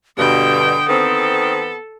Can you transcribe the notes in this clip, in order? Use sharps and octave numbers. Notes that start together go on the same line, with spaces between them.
G2 B2 D3 G5 D#6
D#3 B3 C4 A4